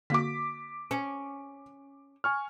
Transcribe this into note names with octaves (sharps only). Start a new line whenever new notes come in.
D3 A#3 F#4 D6 B6
C#4
G#5 C#6 F6